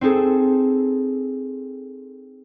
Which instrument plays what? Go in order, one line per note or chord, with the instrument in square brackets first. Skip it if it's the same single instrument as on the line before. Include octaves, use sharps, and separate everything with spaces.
[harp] C4 D#4 G#4 A4